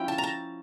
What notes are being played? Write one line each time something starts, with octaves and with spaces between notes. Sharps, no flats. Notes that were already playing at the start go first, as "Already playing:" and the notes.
Already playing: F3 C#4 E4 G5
A5
A#5
A5